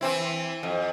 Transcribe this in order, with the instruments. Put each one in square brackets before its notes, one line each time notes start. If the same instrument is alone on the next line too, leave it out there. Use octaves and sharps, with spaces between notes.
[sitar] E3 C4 E4
F2